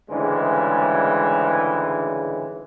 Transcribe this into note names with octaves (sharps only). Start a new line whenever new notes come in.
D2 G#2 C#3 E3 G3 G#3